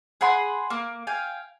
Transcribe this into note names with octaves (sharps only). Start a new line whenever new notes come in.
G#4 F#5 B5 C6
A#3
F5 G5 G#5